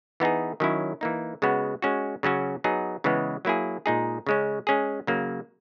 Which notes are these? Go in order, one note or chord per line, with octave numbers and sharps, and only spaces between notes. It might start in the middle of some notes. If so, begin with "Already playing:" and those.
E3 B3 D#4 G#4
D#3 F#3 C#4 E4
E3 A#3 D#4
C#3 G#3 B3 F#4
G#3 C#4 F#4
C#3 F#3 C#4 F#4
F#3 B3 D#4 G#4
C#3 E3 G#3 B3
F#3 A#3 E4 G#4
A#2 G#3 D#4 G#4
C#3 G#3 C#4
G#3 C#4 G#4
C#3 F#3 A#3